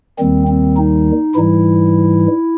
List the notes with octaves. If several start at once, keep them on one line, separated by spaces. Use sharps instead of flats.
D#2 D#3 G3 C4
C4
D#4
G#2 E3 G3 E4